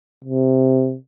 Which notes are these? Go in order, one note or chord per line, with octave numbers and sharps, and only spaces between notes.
C3